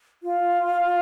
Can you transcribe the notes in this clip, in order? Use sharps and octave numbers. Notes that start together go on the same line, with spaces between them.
F4